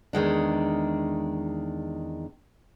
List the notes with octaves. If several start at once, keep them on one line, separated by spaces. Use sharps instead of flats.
E2 D#3 G#3 D4